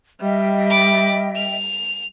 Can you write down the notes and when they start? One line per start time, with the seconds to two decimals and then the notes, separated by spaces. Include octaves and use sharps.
0.21 G3 D#5 E5 G5
0.68 B5 D6
1.36 F7